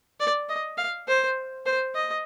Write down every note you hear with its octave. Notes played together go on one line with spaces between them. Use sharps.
D5
D#5
F5
C5
C5
D#5